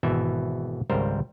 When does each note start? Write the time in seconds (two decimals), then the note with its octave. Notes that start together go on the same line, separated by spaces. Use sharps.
0.03 G#1 B2 E3 E5
0.90 G#1 C#2 G3 A#4 C5